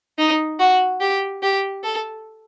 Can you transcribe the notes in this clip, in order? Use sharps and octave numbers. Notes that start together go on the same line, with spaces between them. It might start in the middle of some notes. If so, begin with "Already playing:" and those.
D#4
F#4
G4
G4
A4